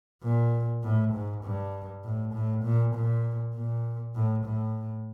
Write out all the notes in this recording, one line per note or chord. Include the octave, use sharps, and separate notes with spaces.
A#2
A2
G#2
G2
A2
A2
A#2
A#2
A#2
A2
A2